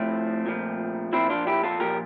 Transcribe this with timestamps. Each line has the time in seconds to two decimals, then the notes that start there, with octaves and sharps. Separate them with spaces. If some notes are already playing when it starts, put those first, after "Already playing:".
Already playing: A2 F3 A3 C4
0.46 A#2 F3
1.13 A#2 F3 C4 E4
1.30 D4 F4
1.47 E4 G4
1.63 F4 A4
1.80 A#2 F3 G4 A#4